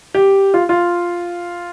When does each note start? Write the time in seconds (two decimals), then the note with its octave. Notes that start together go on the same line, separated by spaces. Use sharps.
0.14 G4
0.54 F4
0.69 F4